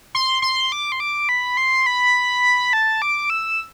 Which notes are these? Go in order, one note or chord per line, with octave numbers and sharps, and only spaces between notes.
C6
C6
D6
C6
D6
B5
C6
B5
A5
D6
E6